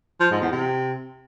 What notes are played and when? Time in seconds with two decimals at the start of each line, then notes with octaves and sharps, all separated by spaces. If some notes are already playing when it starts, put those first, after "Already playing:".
0.20 F3
0.31 G#2
0.41 E2
0.52 C3